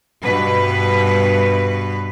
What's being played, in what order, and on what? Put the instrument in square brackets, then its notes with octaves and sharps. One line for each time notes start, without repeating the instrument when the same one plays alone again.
[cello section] G2 B2 B4